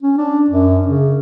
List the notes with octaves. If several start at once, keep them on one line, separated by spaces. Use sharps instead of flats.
C#4
D4
F#2
C#3